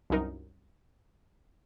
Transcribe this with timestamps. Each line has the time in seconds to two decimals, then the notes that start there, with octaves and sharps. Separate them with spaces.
0.10 C2 F#2 D#4 A#4